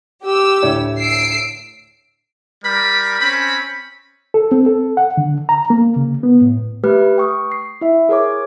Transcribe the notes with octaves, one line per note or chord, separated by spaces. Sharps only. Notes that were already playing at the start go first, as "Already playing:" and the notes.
G4 E6
D2 A2 C#5
E6 C7 D7
G3 A#4 B5
C4 C#4 B5
A4
C4
A4
F#5
D3
A#5
A#3
C#3
B3
A2
A3 G4 B4 F6
G5 C#6 D#6
C7
E4 E5
G#4 A#4 C#5 D6